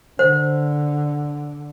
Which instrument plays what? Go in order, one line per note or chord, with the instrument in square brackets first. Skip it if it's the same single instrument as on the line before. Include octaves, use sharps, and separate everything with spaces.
[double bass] D3 [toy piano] C5